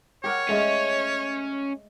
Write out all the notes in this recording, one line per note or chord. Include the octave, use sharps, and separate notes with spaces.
G4 A#4 C#5 F#5
G#3 A3 C#4